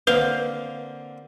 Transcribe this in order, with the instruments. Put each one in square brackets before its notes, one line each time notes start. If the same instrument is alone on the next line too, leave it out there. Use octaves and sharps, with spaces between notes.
[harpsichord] D3 A#3 C4 [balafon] B4 [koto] F5